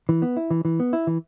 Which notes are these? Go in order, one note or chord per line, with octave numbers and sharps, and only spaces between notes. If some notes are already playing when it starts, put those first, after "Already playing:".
E3
B3
E4
E3
E3
B3
E4
E3